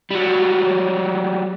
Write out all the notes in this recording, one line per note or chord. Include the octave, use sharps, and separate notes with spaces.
F#3 G3